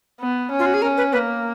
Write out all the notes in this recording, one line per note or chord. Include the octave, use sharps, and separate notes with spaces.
B3
C#4
F4
F#4
G#4
C#4 A#4
B4
A#3 B4